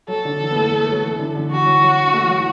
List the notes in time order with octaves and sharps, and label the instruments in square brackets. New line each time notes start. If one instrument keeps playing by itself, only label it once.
[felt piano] F#3 [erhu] A4
[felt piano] D3
E3
B3
A3
B3
A3
F#3
E3
D3
D3
[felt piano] E3 [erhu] F#4
[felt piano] F#3
F#3
A3
E3
F#3